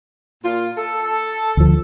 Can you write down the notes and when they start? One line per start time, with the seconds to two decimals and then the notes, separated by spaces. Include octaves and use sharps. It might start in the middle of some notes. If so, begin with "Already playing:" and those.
0.44 A#2 F4
0.78 A4
1.57 D2 F3